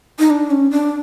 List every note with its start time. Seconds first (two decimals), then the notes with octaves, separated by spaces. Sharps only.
0.19 D#4
0.30 D4
0.51 C#4
0.71 D4